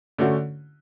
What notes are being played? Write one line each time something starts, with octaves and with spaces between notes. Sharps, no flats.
D3 A3 C#4 F#4